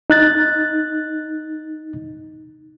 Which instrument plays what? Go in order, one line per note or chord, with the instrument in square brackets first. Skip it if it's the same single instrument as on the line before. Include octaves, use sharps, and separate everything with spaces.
[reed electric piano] D#4 F#6 A6